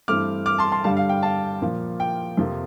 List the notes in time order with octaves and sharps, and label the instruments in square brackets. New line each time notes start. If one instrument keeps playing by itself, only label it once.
[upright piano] G2 E3 A3 C4 D6 F6
D6 F6
A5 C6
A5 C6
G2 D3 G3 F5 A5
F5
G5
F5 A5
A#2 F3 A#3
G5
F2 C3 F3 A#3